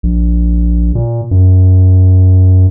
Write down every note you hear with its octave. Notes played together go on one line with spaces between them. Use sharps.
A#1
A#2
F#2